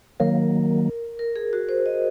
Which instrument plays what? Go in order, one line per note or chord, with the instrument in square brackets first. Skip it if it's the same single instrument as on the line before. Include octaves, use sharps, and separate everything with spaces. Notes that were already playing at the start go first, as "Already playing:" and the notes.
[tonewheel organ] D#3 F#3 A#3 [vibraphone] A#4
[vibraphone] A#4
G#4
F#4
C5
D#5